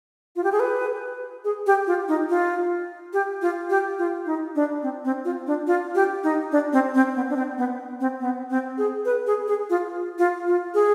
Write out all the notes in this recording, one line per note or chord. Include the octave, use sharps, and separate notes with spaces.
F4
G4
G#4
B4
G#4
G4
F4
D#4
F4
G4
F4
G4
F4
D#4
D4
C4
C4
F4
D4
F4
G4
D#4
D4
C4
C4
B3
D4
C4
B3
C4
B3
C4
G#4
B4
G#4
G#4
F4
F4
F4
G#4